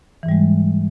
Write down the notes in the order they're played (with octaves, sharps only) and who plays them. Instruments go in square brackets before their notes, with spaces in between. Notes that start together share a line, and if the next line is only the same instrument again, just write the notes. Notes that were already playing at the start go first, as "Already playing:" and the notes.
[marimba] E3
G#2
G3
G#3